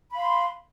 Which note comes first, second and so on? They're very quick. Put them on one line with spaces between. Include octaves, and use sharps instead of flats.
B5 F5 C6